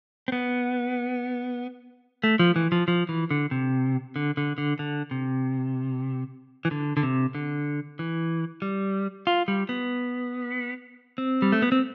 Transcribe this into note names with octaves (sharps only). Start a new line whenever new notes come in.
C4
B3
A3
F3
E3
F3
F3
E3
D3
C3
D3
D3
D3
D3
C3
E3
D3
D3
C3
D3
E3
G3
F4
G3
B3
C4
G3
A3
B3
C4